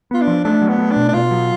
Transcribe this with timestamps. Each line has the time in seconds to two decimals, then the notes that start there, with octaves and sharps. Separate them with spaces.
0.11 B3 F4
0.22 D4
0.27 F3
0.44 A3 D4
0.62 F#3
0.68 B3
0.79 A3
0.91 D4
0.96 B2
1.08 D4
1.14 B2 F4
1.31 F#3